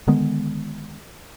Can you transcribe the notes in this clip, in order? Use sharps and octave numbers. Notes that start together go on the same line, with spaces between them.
D3 D#3 G#3 B3